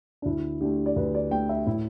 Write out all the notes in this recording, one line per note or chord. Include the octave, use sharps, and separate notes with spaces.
D4
D2 E4
D3 A3 G4
D5
D2 B4
D5
D3 A3 G5
E5
A2 E4